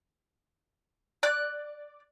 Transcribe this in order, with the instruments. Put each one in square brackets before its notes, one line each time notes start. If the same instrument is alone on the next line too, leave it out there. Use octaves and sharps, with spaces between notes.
[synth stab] D5 [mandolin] F#6